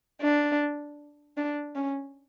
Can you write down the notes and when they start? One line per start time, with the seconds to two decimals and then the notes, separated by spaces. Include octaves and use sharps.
0.21 D4
1.37 D4
1.75 C#4